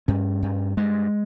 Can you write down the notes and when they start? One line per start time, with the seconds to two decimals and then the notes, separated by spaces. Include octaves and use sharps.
0.08 G2 C#4
0.42 G2
0.77 G2 G#3